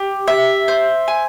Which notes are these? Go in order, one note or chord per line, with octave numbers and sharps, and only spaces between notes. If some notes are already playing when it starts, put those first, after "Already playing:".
Already playing: G4
E5
C5
G#5